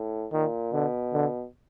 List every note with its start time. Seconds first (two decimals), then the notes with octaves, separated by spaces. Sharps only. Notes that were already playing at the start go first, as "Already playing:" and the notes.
Already playing: A2
0.33 A#2 D#3
0.73 B2 D3
1.14 D3